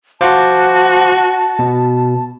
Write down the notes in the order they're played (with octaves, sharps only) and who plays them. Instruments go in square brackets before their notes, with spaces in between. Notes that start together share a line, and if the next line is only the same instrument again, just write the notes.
[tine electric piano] F4 C5 D6 [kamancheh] F#4 [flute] A5
[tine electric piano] B2